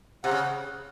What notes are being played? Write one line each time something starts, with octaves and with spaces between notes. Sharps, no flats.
C3 F#5
C#3